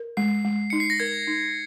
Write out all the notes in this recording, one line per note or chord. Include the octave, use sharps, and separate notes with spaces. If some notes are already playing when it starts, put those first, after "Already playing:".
Already playing: A#4
G#3 C7
G#3
D#4 C#7
C7
A#6
A#4 G#6
D#4